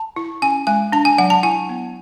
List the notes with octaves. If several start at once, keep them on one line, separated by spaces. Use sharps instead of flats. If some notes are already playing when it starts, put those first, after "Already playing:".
Already playing: A5
E4
C#4 G#5
G#3 G#5
D4 A5
G#5
F#3 F#5
A5
E4 G#5
B3